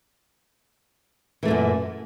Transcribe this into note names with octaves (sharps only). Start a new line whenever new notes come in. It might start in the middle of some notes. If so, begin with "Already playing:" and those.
F#2 A#2 E3 A3